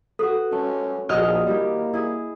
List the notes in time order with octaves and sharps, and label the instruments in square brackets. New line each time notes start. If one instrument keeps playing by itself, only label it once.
[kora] F#4 B4 [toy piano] A4
[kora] A3 [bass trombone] C#4
[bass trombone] A#1 [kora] F#4 G#4 [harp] D#5 F6
[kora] G3 E4 G4 [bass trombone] A#3
[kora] E4 G#4